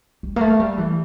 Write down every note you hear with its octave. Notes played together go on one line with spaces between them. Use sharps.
G3
A#3
A3
G3
E3